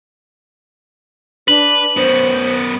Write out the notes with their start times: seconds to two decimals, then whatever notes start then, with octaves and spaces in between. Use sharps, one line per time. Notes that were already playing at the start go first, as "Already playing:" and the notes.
1.48 D4 B4 F#7
1.97 F#2 B3 C5